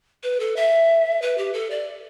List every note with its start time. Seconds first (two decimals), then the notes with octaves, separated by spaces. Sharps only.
0.23 B4
0.40 A4
0.56 E5
1.22 B4
1.38 G4
1.53 A4
1.71 D5